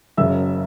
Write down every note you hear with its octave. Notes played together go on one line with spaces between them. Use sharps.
F#1 F#2 C#3 F#3 E5 E6